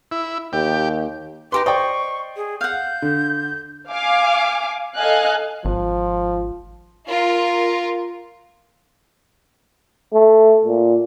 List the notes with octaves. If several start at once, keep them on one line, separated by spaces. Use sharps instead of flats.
E4
D#2 G4
D#4 G4 B4 C6 D6
C5 D5 D#5 G5 C#6
G#4
F5 F#5 G6
D3
F5 G#5 D6
A4 D#5 F5 G#5 F#6
G#1 F3
F4 A#4
A3
A#2